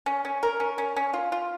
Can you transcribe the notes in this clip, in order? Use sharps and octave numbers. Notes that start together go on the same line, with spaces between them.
C#4
C#4
A#4
C#4
C#4
C#4
F4
F4